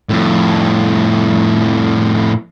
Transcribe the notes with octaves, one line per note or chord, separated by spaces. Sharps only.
F2 A2